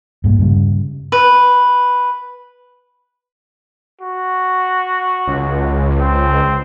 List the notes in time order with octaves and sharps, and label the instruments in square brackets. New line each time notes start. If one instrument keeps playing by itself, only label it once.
[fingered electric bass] G2 A#2 G#3
G2 C#3 G3
[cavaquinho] B4
[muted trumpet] F#4
[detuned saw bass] C#2
[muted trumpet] C4